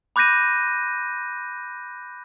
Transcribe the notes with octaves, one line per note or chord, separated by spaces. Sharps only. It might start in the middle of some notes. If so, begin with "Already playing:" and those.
B5 D6 F#6 G6 A#6 D#7